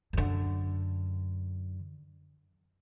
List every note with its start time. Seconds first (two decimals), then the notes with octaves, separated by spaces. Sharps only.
0.13 F#2 D3